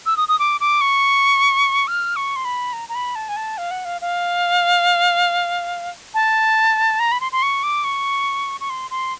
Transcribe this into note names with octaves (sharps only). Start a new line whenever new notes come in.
E6
D#6
D#6
D6
D6
C#6
F6
C#6
C6
B5
A#5
A#5
B5
A5
G#5
A5
F5
F#5
F5
F5
A5
A#5
B5
C6
C6
C#6
D6
C#6
C#6
C6
C6